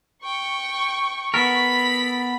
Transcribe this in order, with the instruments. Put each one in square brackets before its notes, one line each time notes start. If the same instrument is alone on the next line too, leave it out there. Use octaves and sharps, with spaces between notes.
[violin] G5 [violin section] C#6
[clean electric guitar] B3 A4 A#4 [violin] B5 B6